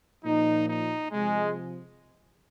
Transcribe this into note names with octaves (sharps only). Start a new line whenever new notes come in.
A#2 F3 D#4
D#4
C3 F3 G#3